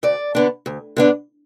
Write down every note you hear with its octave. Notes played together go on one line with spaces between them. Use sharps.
D2 D5
D3 B3 D4
D2
D3 B3 D4